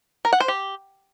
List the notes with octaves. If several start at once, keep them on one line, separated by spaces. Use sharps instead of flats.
A#4
F#5
C5
G4